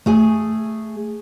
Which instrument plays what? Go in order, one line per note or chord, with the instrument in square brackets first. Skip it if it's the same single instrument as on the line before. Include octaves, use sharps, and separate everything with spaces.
[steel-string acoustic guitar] A3 G#4 G#5